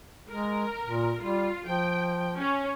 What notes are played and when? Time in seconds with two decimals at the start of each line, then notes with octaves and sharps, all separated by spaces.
0.29 G#3 A#4
0.87 A#2
1.21 G3 F4
1.66 F3 G5
2.37 C#4